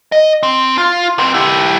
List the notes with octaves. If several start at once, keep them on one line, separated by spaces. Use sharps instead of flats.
D#5
C4
F4
B3 C4
E4 G4